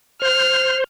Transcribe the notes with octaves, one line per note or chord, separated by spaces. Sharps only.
C5 F6